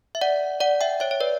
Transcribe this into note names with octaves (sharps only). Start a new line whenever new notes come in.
E5
D5 F#5
D5 F#5
E5 G5
C#5 E5
C#5
B4 D5